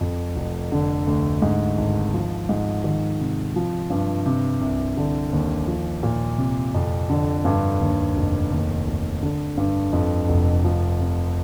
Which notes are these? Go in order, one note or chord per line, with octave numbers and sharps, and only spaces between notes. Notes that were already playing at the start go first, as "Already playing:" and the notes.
F2
F1
D3
D2
G#2
G#1
F3
G#2
D#3
C3
F3
G2
C3
C2
D3
D#2
F3
A#2
C3
F2
D3
G2
D#2
F1
D#2
F1
D3
G2
F2
F1
F3
C3